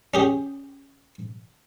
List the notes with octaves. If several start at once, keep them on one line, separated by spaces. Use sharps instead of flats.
C#4 G4 G#4